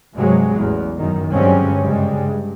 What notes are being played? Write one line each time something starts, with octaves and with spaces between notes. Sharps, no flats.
G2 C3 F#3 G#3
A1 E2
F#2 D#3
G2 D3 F#3 G#3 C4 C#4
F#2 C#3 G3 G#3
G2